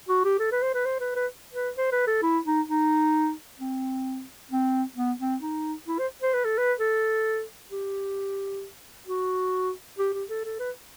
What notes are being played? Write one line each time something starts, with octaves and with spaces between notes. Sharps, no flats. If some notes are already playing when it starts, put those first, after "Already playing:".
F#4
G4
A4
B4
C5
B4
C5
B4
B4
B4
C5
B4
A4
E4
D#4
D#4
C4
C4
B3
C4
D#4
E4
C5
C5
B4
A4
B4
A4
G4
F#4
G4
G4
A4
A4
B4